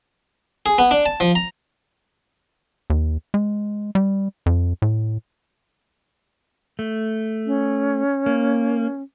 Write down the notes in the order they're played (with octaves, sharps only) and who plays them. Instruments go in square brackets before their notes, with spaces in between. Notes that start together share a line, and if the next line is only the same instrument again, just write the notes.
[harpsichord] G#4
B3
D4
A5
F3
A#5
[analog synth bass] D#2
G#3
G3
F2
A2
[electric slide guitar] A3
[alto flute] C#4
[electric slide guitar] A#3